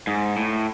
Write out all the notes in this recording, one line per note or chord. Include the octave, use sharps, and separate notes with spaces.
G#2
A2